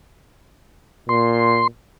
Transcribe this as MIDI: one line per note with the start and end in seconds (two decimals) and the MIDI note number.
1.09 1.66 46
1.09 1.67 84